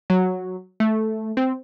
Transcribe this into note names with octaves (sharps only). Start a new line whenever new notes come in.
F#3
A3
C4